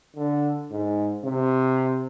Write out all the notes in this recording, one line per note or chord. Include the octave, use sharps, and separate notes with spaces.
D3
G#2
C3